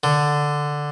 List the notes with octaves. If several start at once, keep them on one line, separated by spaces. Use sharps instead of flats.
D3